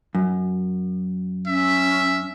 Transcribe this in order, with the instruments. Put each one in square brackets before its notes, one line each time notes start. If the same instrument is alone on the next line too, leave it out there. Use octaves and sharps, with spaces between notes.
[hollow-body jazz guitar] F#2
[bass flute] C#4 [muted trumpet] E5